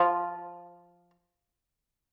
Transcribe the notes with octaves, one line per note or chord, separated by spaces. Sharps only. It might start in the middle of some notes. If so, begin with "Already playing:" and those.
Already playing: F3 F4